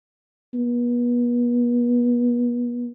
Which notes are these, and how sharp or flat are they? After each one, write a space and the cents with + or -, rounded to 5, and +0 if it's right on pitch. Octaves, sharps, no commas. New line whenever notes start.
B3 -35